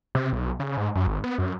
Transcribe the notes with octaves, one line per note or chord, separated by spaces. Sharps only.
C3
B1
C#3
G#2
F#2
G#1
B3
F#2